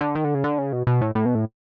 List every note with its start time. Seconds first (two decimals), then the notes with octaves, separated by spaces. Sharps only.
0.01 D3
0.15 D#3
0.24 D3
0.34 C#3
0.44 D3
0.58 C#3
0.73 B2
0.87 B2
1.01 A2
1.15 A2
1.25 B2
1.35 A2